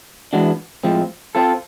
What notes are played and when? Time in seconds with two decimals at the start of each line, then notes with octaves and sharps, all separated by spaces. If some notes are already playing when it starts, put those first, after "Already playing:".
0.33 E3 G#3 B3 D4 F#4
0.84 A2 F3 G#3 C4
1.35 C4 F4 A4